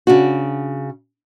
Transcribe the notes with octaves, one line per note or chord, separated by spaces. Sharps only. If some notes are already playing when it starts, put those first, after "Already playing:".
C#3 D4 F#4